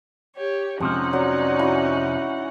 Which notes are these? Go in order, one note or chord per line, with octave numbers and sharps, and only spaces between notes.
G4 C#5
F2 C3 F3 G#3 C#4 D#4 F#5
F#3 C#5 D5
E3 F#4